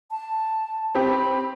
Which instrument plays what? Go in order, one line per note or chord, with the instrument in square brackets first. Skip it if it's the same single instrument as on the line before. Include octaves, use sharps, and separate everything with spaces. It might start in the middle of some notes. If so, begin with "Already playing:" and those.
[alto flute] A5
[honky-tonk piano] C4 G4 [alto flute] B5